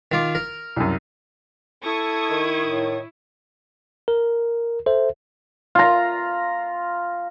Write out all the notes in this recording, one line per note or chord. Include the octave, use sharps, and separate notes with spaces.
D#3 F4 D6
A#4
C2 F#2
E4 A4 C#6 D#6 G#6
D#3
A2
A#4
A4 C5 E5
F4 A#5